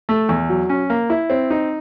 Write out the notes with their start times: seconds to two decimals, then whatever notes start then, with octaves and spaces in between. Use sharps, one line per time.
0.09 A3
0.29 E2
0.49 F#3
0.69 C#4
0.90 A#3
1.10 E4
1.30 C4
1.50 D#4